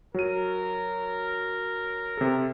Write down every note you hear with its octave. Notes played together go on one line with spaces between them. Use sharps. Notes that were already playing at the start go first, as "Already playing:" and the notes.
F#3 A#4 D#7
C3 A4